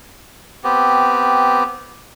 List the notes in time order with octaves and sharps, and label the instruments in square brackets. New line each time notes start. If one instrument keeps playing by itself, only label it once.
[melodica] B3 C4 G4